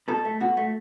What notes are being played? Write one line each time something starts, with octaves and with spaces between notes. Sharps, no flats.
B2 A4
A3
B2 F#4
A3